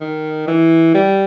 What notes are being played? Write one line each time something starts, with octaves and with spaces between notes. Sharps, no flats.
D#3
E3
G3